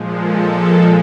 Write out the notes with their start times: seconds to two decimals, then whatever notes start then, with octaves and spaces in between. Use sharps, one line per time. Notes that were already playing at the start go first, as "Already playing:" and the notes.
Already playing: A#2 F3 G#3
0.18 A4